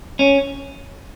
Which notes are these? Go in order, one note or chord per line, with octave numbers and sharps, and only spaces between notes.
C#4